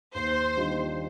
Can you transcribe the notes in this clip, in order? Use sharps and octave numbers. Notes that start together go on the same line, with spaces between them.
D#2 C5
D#3 G3 D4 F4